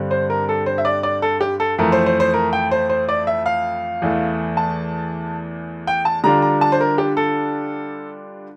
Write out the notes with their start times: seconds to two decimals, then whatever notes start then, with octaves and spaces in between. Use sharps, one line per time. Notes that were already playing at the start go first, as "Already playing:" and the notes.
Already playing: G2 D3 G3 C4
0.11 C5
0.30 A#4
0.49 A4
0.66 C5
0.78 E5
0.85 D5
1.03 D5
1.22 A4
1.41 G4
1.60 A4
1.78 F2 E3 A3 E4 A#4
1.92 C5
2.06 C5
2.20 C5
2.34 A#4
2.53 G5
2.71 C5
2.90 C5
3.09 D5
3.27 E5
3.46 F5
4.02 E2 E3 A3
4.57 A5
5.87 G5
6.05 A5
6.24 D3 G3 D4 F4 A#5
6.42 A#5
6.61 A5
6.72 C5
6.81 A#4
6.98 G4
7.17 A4